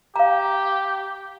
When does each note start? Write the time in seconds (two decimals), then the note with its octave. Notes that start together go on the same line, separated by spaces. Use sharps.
0.16 G4 F5 A#5